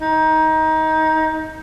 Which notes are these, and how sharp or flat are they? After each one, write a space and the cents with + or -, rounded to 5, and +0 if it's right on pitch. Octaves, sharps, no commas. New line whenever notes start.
D#4 +20